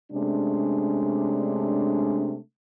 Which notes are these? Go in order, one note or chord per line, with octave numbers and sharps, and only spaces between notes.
C3 G#3 A3 C#4 D4